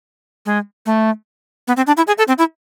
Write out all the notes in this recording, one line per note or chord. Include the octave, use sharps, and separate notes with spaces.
G#3
A3
B3
C4
D4
E4
G#4
A4
C4
E4